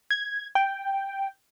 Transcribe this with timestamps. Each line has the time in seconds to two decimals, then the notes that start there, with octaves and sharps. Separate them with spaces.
0.11 G#6
0.55 G5